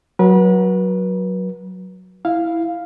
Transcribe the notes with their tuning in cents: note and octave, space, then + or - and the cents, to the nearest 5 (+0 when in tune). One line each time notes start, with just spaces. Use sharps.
F#3 +0 B4 -35
E4 +0 F5 +0